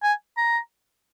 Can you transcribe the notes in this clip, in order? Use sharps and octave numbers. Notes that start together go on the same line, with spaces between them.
G#5
A#5